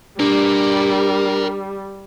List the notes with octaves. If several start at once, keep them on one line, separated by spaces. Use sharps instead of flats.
G3 D4 A#4 D5